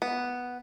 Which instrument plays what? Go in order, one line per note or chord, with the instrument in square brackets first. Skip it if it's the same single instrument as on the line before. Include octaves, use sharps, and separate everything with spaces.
[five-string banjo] B3